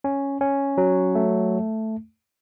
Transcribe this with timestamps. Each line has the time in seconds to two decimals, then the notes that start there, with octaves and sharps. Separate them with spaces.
0.04 C#4
0.41 C#4
0.78 F#3
1.15 A3